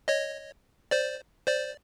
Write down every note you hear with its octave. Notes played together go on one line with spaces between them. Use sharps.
C#5 D#5
C5 D5
C5 D5